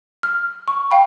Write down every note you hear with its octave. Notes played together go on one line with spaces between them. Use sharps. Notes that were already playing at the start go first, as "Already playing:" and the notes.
F6
C#6
F5 G5 B5